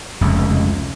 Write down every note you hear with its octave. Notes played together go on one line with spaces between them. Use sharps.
F1 C#2